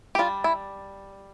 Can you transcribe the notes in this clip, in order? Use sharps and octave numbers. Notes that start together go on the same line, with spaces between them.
G4
G3 D4 F4
E4